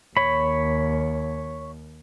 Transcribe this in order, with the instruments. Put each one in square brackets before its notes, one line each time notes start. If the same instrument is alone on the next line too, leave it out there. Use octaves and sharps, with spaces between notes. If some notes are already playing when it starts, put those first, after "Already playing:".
[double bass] D#2 [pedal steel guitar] C#5 B5